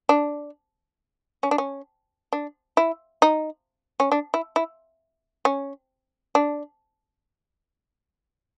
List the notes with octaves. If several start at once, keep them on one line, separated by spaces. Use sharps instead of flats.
D4
C#4
D4
C#4
D4
E4
D#4
C#4
D4
E4
E4
C#4
D4